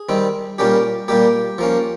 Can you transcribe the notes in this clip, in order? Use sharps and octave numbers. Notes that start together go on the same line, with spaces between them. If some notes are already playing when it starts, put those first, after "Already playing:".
Already playing: G#4
D#3 G3 C4
A#2 G3 A#3 C#4 G4
A#2 G3 A#3 G4
F3 A#3 C#4